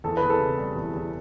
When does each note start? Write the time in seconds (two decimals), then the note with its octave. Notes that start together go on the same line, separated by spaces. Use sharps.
0.04 E2 A4
0.17 E2 B4
0.30 A4
0.39 C#3
0.58 G3
0.75 E2
0.94 E2